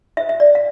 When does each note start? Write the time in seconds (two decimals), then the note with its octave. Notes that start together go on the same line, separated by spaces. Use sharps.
0.17 F4 C5 E5
0.29 E5
0.40 D5
0.55 F5